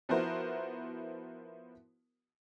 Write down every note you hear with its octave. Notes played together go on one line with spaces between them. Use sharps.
F3 B3 E4 F#4 A#4 C5